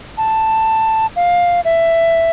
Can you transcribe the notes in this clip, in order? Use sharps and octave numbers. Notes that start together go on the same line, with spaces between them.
A5
F5
E5